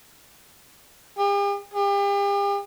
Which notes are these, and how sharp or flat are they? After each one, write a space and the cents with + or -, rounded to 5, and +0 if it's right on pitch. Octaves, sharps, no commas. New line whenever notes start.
G4 +45
G4 +40